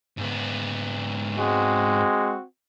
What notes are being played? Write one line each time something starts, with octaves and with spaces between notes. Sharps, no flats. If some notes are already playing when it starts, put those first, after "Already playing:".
G#2 B3
G#3 C4 F#4